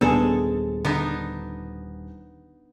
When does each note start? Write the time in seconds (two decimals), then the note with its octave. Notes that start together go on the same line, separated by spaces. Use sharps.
0.01 D#1 G#3 B3 D4 G#4 A4
0.85 D3 B3 D4 D#4